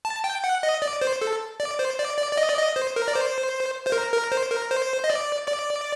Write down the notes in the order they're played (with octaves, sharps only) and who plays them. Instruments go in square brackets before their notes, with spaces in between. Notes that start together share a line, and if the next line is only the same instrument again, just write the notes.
[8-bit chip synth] A5
G5
F#5
D#5
D5
C5
A4
D5
C5
D5
D5
D5
D#5
D5
D#5
C5
A#4
D5
C5
C5
A#4
A#4
C5
A#4
C5
D#5
D5
D5